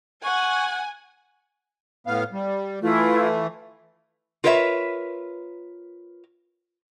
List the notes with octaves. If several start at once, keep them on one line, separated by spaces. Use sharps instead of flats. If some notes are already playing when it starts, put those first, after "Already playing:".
F#5 G#5 C#6
A2 B3 F5
G3
E3 A3 E4 F4
F4 A#4 B4 C#5 D#5 E5